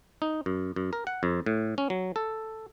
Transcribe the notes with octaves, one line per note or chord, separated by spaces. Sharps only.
D#4
F#2
F#2
A#4
F#5
F2
A2
C#4
F#3
A4